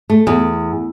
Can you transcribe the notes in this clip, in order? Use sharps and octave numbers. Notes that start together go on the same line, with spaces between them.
A3
E2